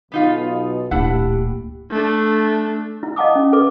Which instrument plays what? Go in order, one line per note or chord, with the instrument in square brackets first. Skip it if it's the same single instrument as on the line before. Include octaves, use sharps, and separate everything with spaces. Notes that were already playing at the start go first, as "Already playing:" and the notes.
[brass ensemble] B1 B2 [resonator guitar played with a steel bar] B3 D#4 F4
[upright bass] D1 A#2 [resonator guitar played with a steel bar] D4 E4 F#5 [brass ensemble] G4
[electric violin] A3 D4
[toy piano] E4
D#5 F5 F#5 A5 D6 D#6
C#4
A4 B4 D6